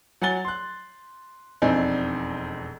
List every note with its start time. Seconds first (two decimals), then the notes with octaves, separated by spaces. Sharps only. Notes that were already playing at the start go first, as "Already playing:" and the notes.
0.22 F#3 F#5 G#5 A6 G7
0.45 C6 F#6
1.62 E1 F2 C4 D4 D#4 G#5